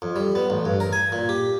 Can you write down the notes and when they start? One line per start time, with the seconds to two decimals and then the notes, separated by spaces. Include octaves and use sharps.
0.02 F2
0.16 G3
0.35 B3
0.50 A1
0.65 G2
0.80 A#4
0.93 G#5
1.12 A#2
1.29 G4